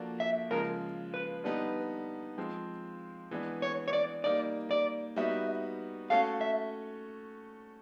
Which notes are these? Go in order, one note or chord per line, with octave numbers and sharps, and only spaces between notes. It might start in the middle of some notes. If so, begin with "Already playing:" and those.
Already playing: F3 A#3 D4 F#4 A4
E5
C#3 F3 G#3 A#4
B4
D3 G3 B3 D#4
F3 G#3 C4
E3 G#3 B3 D4
C#5
C#5
D5
G3 A#3 D#4 D5
D5
G3 B3 D#4 F#4 E5
A3 C#4 F#4 A4 F5
E5